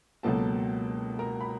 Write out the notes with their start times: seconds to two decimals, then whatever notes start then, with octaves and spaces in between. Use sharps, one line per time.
0.23 C#2 B2 F#3 A#3 A4 A5
1.19 A#4 A#5
1.41 B5